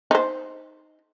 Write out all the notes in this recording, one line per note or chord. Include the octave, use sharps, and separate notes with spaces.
D#4 C5